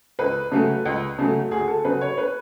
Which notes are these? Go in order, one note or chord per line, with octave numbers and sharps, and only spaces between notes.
C#2 B4
C#3 F#3 A3
C#2
C#3 F#3 A3
D2 G#4
A4
C#3 F#3 B4
C#5
B4